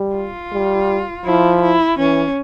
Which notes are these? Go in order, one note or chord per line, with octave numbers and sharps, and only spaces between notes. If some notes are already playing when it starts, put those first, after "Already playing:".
Already playing: G3
F4
G3
F3 E4
E4
E3 C#4